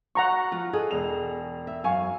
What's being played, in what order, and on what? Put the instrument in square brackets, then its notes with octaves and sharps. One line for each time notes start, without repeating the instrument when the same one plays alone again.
[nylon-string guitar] F#4 [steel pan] F#5 A#5 C#6
[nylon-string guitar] F3 F4
G#4 A4 D#5
[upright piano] E1 F7
[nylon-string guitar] E5
[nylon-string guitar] F#2 [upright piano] F5 G#5 C#6